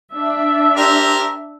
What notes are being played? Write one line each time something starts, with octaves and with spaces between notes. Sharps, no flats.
D4 E5
G4 A#4 C5